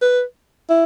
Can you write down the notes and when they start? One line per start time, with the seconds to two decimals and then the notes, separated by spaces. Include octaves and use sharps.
0.02 B4
0.70 E4